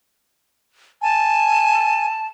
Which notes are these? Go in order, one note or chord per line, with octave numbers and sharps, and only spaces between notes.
G#5 A5